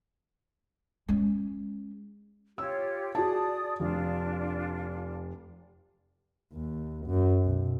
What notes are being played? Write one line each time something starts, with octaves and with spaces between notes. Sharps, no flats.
G#3 C#4
F4 G4 C#5 E6
F#4 G#4 D5 A5 D#6
F1 D4 F4
D#2
F#2
B1